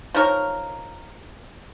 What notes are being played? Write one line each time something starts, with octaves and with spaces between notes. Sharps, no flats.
F3 D#4 A#4 C#5